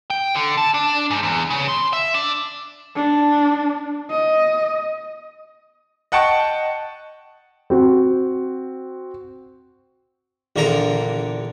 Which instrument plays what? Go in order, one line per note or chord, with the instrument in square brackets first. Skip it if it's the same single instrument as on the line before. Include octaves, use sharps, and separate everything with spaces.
[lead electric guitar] G5
D3
A5
D4
G#2
E2
C#3
C6
E5
D4
[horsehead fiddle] D4
D#5
[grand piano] D#5 F#5 G5 A5 C#6
[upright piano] C4 F#4
[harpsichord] A#1 E2 A#2 D3 A#4 A#5